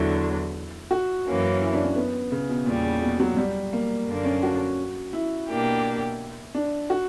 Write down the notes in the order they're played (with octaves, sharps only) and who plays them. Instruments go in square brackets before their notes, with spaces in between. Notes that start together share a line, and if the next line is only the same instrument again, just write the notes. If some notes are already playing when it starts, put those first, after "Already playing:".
Already playing: [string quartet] E2 D3 F#3 [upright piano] E4
[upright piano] F#4
[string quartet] F#2 E3 A#3 C#4
[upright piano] E4
D4
C#4
B3
C#3
B2
[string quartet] E2 C#3 G3 [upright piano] A#2
[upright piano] B2
F#3
G3
A#3
[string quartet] F#2 D3 A#3 D4
[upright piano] C#4
F#4
E4
[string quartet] B2 A#3 D4 G4
[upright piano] D4
F#4